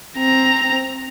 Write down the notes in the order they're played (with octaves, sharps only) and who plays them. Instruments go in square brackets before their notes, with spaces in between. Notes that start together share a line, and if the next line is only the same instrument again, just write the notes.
[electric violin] C4 A#5